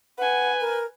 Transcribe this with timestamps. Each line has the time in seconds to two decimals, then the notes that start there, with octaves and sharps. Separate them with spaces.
0.18 B4 F#5 G#5
0.61 A#4